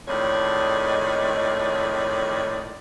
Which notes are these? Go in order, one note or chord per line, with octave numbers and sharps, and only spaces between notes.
F2 A2 D#3 G#3 C#5 D5